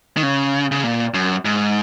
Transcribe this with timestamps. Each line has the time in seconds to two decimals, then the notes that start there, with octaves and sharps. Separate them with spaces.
0.17 D#3
0.23 C#3
0.72 C#3
0.84 A#2
1.14 F#2
1.45 G#2